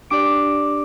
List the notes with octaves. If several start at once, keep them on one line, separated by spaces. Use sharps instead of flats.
D4 G4 D5 D6 D7